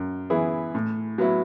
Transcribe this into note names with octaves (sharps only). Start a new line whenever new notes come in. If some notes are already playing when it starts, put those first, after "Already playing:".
Already playing: F#2
E3 B3 E4 G#4
A2
F#3 B3 E4